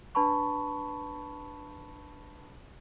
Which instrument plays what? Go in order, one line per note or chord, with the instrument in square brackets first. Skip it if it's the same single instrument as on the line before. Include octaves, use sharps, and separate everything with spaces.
[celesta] D4 B4 A5 B5 C#6